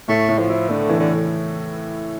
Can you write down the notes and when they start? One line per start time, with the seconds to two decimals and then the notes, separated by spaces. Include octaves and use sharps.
0.08 A2 A3
0.29 A2
0.39 F3
0.49 E4
0.69 D3 A3
0.89 E3
1.00 D3